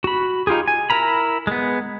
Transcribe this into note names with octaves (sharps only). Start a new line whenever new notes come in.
F#4 B5
D#4 F4 G4 G#4
G#5
E4 A#4 A#5 B5
G#3 B3